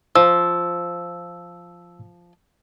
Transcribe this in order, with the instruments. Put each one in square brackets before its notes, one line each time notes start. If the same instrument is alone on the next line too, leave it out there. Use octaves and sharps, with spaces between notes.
[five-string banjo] F3 [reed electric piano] E6